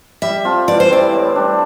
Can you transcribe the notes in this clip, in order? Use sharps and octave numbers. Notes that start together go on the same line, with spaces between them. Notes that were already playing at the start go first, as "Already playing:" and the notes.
G3 E5
C4 F4 A4
E3 D5
C5
G3 C4 E4 D5
A2
G3 D4